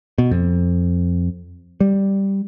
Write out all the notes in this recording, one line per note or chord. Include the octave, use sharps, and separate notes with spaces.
B2
F2
G3